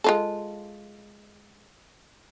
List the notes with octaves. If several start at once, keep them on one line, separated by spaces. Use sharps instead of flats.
G#3 F4 A4